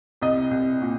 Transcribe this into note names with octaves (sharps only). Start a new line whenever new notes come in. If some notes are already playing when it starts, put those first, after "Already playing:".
C2 D#5
C2
A#2